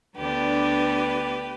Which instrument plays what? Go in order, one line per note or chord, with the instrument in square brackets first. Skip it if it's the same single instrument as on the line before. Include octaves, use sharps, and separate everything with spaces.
[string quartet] D2 D3 B3 D4 G4 B4